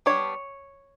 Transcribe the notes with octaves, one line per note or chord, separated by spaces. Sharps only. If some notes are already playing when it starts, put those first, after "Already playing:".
G3 B3 D4 C#5